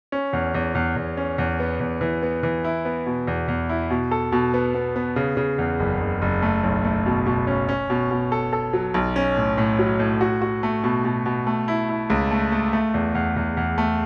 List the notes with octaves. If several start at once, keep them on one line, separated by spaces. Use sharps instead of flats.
C#4
E2
E2
E2
E2
C#4
E2
B3
E2
E3
B3
E3
E4
B3
B2
E2
E2
E4
B2
A4
B2
B3
B3
B3
C#3
C#3
E2
F#1
F#1
F#1
A3
B1
A3
B2
B2
C#4
C#4
B2
B2
A4
A4
F#3
B1
C#4
A2
A2
F#3
A2
F#4
F#4
A3
B2
B2
B2
A3
E4
E4
C#2
A3
A3
A3
E2
E2
E2
E2
A3